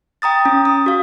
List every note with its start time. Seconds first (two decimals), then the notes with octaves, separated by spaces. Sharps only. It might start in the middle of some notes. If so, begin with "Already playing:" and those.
0.22 G5 A#5 D#6 A6
0.45 C#4
0.65 D#6
0.86 F#4 F5